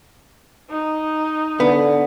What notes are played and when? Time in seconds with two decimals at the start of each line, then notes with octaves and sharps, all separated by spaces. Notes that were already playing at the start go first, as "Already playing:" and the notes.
0.70 D#4
1.60 D3 B3